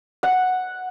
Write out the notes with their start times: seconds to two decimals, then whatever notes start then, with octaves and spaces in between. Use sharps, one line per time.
0.23 F#5